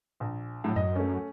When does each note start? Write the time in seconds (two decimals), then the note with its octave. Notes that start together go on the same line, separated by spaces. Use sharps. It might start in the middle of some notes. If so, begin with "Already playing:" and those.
0.20 A#1
0.64 A2 F#3
0.76 F#2 D#5
0.96 A3 C#4